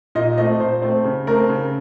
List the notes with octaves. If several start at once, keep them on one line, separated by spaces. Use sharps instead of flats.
A#2 D#5
A3 C4 D#5
A#2 C5
A3 C4
C#3
A3 C4 A#4
C#3